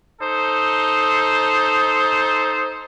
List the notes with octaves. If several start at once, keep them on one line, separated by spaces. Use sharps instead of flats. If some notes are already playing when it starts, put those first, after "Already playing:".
D#4 A4 C5